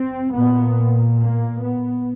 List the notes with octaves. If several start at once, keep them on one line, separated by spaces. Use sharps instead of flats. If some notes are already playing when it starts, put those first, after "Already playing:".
Already playing: C4
A#2 B3
A#3
B3